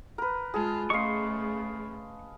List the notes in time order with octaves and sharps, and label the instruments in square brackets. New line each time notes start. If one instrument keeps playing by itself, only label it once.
[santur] A#4 B4
[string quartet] G#3 F4 [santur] G#4 A5
[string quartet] C#3 A3 [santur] D#5 F5 [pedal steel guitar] C6 C#6